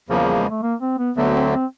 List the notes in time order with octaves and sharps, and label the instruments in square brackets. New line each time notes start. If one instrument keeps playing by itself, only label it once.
[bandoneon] E2 C#3 F3 A#3 [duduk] F#3
[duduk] G3
G#3
A3
A#3
C4
B3
[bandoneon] D2 D3 F#3 A3 [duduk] B3
[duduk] B3
C4
C4